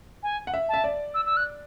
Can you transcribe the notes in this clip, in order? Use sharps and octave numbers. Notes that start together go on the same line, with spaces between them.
G#5
F#5
E5
E5 A5
D5
E6
E6
F#6